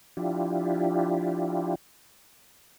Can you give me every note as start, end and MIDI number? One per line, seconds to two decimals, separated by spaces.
0.17 1.75 53
0.17 1.75 62
0.17 1.75 64
0.17 1.75 65
0.17 1.75 67